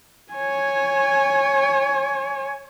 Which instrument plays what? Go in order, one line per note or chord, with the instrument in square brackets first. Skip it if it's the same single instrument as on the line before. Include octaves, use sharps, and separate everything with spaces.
[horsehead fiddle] C#5 G#5